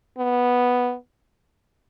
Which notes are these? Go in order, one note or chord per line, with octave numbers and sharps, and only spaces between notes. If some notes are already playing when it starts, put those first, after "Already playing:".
B3